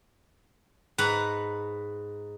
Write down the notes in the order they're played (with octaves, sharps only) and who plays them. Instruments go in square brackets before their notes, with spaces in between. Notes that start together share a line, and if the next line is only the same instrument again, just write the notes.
[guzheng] G#2 B4 F#5 A#5